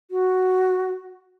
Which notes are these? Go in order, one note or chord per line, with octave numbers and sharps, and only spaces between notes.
F#4